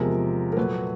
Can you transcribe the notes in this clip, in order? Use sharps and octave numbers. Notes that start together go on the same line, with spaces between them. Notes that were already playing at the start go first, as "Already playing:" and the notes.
Already playing: E2 C3 F3 G#3 A#4
A#4
A#2 F#3 A3 B4